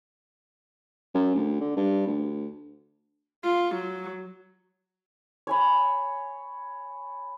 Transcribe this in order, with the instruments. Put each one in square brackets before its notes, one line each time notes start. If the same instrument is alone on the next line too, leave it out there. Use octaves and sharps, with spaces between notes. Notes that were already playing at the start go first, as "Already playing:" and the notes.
[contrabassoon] F#2
D2
D3
G2
D2
[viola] F4
F#3
[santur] C#5 G#5 B5